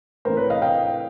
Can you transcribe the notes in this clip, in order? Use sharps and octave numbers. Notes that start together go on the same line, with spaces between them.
A2 E3 A3 C4 A#4 C5
B4 C#5
D#5 F5
F5 G5